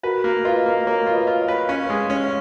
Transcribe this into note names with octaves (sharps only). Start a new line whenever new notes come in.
F#4 A#4 B4
A#3
F4 B4 D#5
A#3
A#3 A#4 C#5
F4
B4 D#5
F4
C#5 F5
B4
C#4 C#5 F5
G#3
C#4
C#5 F5